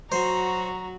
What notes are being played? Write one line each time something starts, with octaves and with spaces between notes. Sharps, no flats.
F#3 F#4 C5 A#5